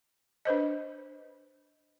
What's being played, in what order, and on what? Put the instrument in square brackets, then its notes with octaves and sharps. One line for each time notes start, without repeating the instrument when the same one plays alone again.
[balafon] D4 B4 C5 D#5